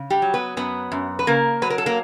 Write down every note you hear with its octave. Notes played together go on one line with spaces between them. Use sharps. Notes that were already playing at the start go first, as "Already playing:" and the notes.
Already playing: C#3
G3 G4
F#3
B3 B4
F#2 B3 B4
F#2
B4
C#3 A#3 A#4
F#3 B4
A#4
A4
A#3 A#4